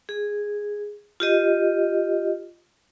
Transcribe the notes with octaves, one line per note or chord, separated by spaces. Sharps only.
G#4
F4 G4 D#5